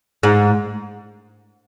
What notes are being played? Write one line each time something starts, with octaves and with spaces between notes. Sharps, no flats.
G#2